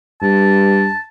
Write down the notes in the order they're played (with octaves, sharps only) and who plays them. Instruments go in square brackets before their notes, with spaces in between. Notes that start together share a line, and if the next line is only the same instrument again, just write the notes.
[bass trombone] G2 [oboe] A5